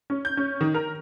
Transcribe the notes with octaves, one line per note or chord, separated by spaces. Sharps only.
C#4
G6
C#4
D#3
A#4